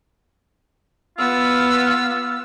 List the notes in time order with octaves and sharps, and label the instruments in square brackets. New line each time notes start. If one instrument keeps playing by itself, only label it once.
[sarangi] B3 [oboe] F4 [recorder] E6